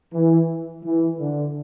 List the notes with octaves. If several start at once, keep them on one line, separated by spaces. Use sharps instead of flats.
E3
E3
D3